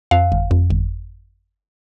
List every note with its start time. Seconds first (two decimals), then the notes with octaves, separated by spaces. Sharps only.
0.11 F2 F5
0.32 G1
0.51 F2
0.70 G1